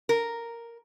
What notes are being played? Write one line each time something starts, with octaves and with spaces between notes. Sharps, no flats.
A#4